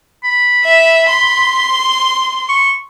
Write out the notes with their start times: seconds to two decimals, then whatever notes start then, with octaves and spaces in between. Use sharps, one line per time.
0.24 B5
0.65 E5
1.09 C6
2.49 C#6